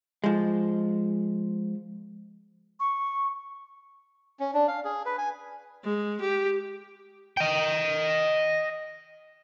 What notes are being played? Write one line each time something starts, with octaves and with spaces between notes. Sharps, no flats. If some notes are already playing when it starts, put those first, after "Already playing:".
F3 G#3
C#6
C#4
D4
F5
G#4
B4
G#5
G#3
G4
D#5 G5